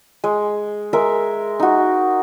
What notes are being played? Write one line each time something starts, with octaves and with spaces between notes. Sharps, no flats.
G#3
G#3 A#4 E5
D#4 F#4